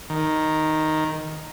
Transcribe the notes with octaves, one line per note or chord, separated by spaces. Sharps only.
D#3